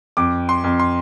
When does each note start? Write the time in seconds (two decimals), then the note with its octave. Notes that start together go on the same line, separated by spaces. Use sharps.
0.17 F2 D6
0.49 C6
0.64 F2
0.79 C6